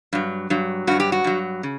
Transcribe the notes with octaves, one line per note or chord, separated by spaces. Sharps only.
G2 F#3
G2 F#3
G2 F#3 F#4
G4
F#4
G2 F#3
C#3